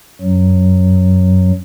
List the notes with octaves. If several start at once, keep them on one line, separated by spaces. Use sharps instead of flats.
F#2 F#3